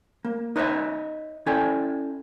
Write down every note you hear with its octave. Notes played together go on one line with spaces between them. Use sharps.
A#3
D#4 B4 C#5 D#5 E5
C#4 E4 A4 D5 G5 G#5